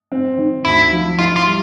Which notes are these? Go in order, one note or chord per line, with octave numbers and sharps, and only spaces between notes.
C4
D#3
D2 E4
F3
E4 F4
F4
G3